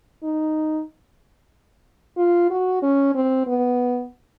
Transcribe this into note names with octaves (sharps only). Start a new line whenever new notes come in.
D#4
F4
F#4
C#4
C4
B3